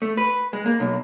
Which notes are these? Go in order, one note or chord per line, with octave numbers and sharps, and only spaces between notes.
A3
B4
G#3
A#3
B1